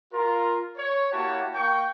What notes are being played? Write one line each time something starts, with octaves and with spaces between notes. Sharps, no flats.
F4 A#4
C#5
A#3 E4 F#4 G4 C#5 A5
A#3 G5 C#6